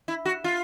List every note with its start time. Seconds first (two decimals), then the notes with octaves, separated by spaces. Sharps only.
0.08 E4
0.25 F#4
0.44 F4